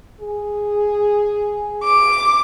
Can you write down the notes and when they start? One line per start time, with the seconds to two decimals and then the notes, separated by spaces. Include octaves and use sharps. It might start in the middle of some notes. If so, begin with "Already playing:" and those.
0.20 G#4
1.84 D6